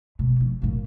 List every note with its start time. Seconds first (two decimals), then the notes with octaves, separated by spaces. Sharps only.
0.19 B2
0.40 F3
0.62 F#2 A#2